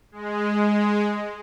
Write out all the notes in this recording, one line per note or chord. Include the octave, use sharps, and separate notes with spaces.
G#3